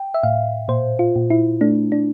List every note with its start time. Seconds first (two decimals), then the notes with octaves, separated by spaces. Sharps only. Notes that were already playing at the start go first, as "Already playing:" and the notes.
Already playing: G5
0.14 E5
0.23 A2 F5
0.68 A#2 C5
0.99 F4
1.16 A#2
1.30 E4
1.61 A3 D4
1.92 D4